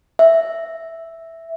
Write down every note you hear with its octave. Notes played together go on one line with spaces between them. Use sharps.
E5